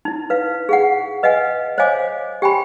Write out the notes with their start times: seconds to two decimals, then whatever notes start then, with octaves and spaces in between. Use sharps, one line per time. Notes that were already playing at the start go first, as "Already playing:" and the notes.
0.05 D#4 E4
0.30 B4 F5
0.69 G#4 F5 F#5
1.23 B4 D#5 F5 F#5 G#5
1.78 C5 C#5 D#5 F5 G#5 D6
2.42 G4 G5 G#5 B5 C6